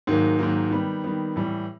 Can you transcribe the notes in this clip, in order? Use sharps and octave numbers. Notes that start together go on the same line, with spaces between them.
G#2 D#3 F#3 A#3
G#2 D#3 F#3 A#3
D#3 G3 B3
D#3 G3 B3
A2 E3 G3